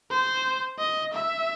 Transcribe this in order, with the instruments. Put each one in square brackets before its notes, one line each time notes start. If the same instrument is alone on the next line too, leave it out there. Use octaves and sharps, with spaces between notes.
[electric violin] C5
D#5
E5